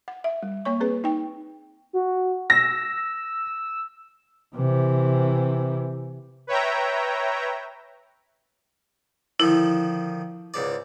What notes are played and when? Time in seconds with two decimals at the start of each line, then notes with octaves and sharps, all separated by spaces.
0.08 F#5
0.24 E5
0.43 G3
0.65 A#3 C#5 C#6
0.80 C4 G#4 B4
1.04 D#4 G5
1.93 F#4
2.50 E6 A#6
4.56 C3 E3
6.47 B4 C#5 E5 G5 A#5
9.40 D3 D#3 F3 E4
10.54 C#2 G#2 D5